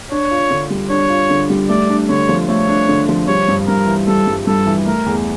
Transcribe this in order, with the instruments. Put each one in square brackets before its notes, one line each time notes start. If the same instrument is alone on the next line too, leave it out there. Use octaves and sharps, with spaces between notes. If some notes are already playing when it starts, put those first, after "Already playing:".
[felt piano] D4 [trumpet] C#5
[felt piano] F4
D3
G3
[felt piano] D4 [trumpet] C#5
[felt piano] F4
D3
G3
[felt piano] A3 [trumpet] D5
[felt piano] D4
[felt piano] D3 [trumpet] C#5
[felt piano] F3
[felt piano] A3 [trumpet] C#5
[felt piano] D4
D3
F3
[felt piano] G3 [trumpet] C#5
[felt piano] G2
[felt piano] G2 [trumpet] A#4
[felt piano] E3
[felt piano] G3 [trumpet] A4
[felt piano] G2
[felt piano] G2 [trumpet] A4
[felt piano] E3
[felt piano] A3 [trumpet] A#4
[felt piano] E2